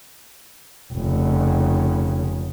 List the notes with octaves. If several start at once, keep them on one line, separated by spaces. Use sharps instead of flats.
F1 C#3